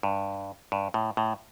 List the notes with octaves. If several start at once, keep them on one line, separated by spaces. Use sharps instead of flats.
G2
G2
A2
A2